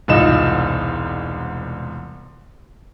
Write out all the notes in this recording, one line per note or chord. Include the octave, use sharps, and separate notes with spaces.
E1 C2 G#2 D#4 F4 E7